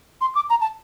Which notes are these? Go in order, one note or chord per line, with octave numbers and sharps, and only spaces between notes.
C6
D6
A#5
A5